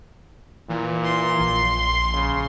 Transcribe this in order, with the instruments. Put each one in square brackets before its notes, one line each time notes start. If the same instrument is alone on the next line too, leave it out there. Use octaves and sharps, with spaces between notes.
[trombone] A#2 [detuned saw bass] E3
[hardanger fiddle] C6
[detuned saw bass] A#1
[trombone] C#3